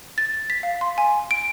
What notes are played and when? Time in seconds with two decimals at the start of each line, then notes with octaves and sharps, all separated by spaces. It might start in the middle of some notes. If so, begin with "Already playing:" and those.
0.18 A6
0.50 B6
0.63 F5
0.81 C6
0.98 G#5
1.31 D7